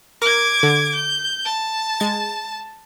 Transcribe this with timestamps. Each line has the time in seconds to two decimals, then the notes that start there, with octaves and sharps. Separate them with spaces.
0.22 A#4 D6 G#6
0.63 D3
0.95 G6
1.45 A5
2.00 G#3 G#6 A6